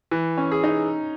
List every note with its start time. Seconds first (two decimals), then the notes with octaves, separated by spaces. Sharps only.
0.11 E3
0.38 C#4
0.52 G#4
0.64 D#4